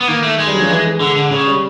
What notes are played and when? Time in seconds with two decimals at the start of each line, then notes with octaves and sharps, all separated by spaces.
0.01 B3
0.08 D#3 A#3
0.23 A3
0.39 G#3
0.47 G3
0.54 F#3
0.62 F3
0.70 E3
0.85 G#3
1.00 D3 G#3
1.16 D3
1.31 C#3 G#3
1.47 G3